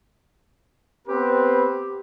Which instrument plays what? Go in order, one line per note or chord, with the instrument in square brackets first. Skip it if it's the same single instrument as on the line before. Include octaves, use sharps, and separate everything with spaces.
[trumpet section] B3 C4 B4 [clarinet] G4